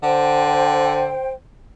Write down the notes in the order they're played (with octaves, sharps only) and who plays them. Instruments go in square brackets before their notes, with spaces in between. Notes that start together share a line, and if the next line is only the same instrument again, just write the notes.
[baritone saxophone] D3 [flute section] C5 G5